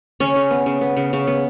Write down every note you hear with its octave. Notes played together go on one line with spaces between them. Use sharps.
C#3 C#4
C#3
B3
C#3
B3
C#3
C#3
B3